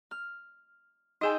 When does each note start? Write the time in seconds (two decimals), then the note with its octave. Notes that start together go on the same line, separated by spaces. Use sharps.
0.11 F6
1.21 D#4 G#4 D#5 G5 G#5